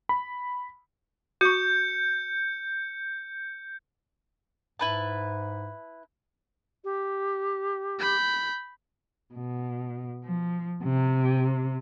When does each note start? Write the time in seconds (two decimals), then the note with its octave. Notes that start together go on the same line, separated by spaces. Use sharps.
0.09 B5
1.41 F#4 C#6 G6 C#7
4.79 G#2 E4 B4 A5
6.84 G4
7.99 B5 G6
9.34 B2
10.24 F3
10.83 C3